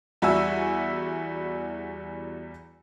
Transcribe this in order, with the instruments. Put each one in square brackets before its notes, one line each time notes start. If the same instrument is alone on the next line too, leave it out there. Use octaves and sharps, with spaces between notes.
[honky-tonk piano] E2 G3 F#4 E5 G#5 E6